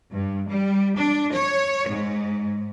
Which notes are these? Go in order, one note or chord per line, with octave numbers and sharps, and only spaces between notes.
G2
G3
D4
C#5
G#2